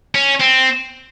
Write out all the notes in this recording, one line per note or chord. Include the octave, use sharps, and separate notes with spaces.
C#4
C4